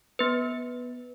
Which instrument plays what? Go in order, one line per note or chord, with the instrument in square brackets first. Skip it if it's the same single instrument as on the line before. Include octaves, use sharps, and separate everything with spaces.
[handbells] B3 B4